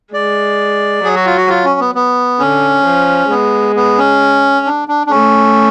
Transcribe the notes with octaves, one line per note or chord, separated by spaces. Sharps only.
G#3 D5
F#3 G#4
F#4
F4
F#4
F4
C#4
B3
B3
D3 C#4
F3
G#3 B3
B3
C#4
D4
D4
D4
A3 C#4